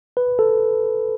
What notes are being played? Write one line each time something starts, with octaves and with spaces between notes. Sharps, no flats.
B4
A4